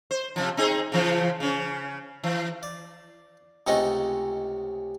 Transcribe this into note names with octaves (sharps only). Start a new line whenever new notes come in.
C5
C3 D#3 F3
C4 D#4 G#4
C#3 E3 F3
C#3 C#4
E3
D5
C#2 C3 A3 C#4 D#4 D#5